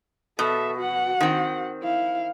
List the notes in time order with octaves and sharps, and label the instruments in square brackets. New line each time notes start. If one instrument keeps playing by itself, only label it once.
[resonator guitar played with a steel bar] B2 [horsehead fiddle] A4 E5
[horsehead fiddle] F#4 F#5
[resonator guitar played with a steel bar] D#3 C4
[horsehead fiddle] E4 F5